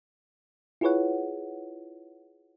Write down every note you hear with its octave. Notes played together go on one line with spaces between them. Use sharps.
E4 F4 G#4 B4 C#5 F#5